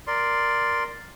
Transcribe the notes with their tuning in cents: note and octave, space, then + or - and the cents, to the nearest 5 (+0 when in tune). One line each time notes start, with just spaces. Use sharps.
A#4 +0 D5 +0 C6 +0